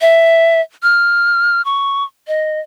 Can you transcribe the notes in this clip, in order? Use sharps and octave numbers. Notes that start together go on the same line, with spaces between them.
E5
F6
C#6
D#5